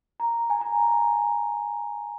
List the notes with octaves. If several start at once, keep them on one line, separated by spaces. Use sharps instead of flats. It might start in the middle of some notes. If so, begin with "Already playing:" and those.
A#5
G#5
A#5